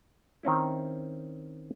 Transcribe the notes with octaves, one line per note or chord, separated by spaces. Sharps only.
D#3 C4 C#4 E4